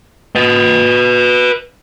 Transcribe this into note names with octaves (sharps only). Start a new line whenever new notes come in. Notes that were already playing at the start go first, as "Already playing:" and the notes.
B4 D#5